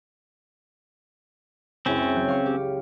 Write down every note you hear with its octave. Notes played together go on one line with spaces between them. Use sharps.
C#2 F#2 C4 C#4 E4
F#3 G6
F5 C#6
G4